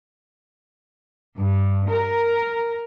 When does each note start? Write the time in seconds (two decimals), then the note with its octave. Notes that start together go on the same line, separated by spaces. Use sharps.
1.38 G2
1.90 A#4